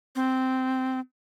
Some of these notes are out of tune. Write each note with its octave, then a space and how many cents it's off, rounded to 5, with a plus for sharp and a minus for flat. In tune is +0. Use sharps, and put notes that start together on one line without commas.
C4 -10